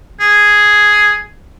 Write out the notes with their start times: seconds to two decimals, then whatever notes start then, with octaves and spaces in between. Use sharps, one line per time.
0.20 G#4